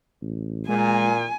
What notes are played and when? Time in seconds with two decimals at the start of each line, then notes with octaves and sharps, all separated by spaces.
0.21 A1
0.68 A#2 G#3 G#5